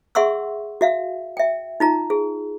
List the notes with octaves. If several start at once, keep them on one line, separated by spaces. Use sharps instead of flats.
G#4 E5 F#5 C6 C#6 E6
F#4 E5 F5
E5 G5
D#4 F4 A#5
G#4